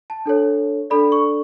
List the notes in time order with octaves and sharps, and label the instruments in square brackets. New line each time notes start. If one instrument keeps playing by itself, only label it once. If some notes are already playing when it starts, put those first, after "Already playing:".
[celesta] A5
D4 A4 C#5
D4 A4 D5 B5
C#6